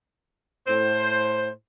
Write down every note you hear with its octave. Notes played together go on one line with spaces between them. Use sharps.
A2 C5